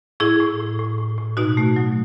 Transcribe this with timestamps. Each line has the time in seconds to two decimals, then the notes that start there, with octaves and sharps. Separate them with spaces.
0.20 A2 E4 G#4
0.40 A2
0.60 A2
0.79 A2
0.98 A2
1.18 A2
1.37 B2 D#4 F#4
1.57 A3
1.76 F#3